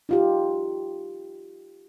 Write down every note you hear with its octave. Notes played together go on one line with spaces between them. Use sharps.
D#4 F4 G4